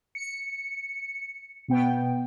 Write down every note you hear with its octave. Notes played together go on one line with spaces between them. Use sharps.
C#7
B2 B3 G5